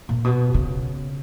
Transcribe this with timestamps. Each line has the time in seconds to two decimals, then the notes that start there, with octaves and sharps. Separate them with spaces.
0.09 A#2
0.24 B2
0.54 C#3